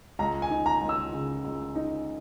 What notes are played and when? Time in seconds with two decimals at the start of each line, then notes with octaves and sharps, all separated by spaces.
0.19 C#2 A#5
0.42 G#5
0.50 D#4
0.66 A#5
0.82 C#2
0.89 E6
1.13 C#3
1.44 C#2
1.75 D#4